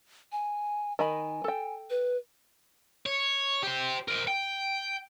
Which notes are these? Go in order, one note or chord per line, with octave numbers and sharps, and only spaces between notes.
G#5
D#3 D#5 G#5 B5
A4 G5
B4
C#5
G4 C5
A#4 C5
G5